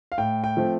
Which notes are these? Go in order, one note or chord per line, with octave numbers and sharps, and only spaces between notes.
F5
A2 G5
G5
F3 A3 C4